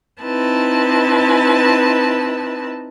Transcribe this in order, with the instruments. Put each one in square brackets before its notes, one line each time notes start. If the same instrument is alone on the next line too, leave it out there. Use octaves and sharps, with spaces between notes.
[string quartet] C4 D#4 E4 B4 A5